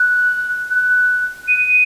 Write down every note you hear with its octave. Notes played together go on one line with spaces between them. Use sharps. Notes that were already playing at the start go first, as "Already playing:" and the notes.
Already playing: F#6
F#6
D#7